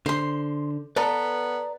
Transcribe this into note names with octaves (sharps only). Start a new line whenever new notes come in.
D3 C5 C6
B3 A4 B4 D5 A#5